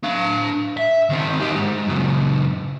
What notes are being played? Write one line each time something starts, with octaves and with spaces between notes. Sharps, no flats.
D4 F5
E5
D#3 C4
D#3 G4
G#2
C#2 F#2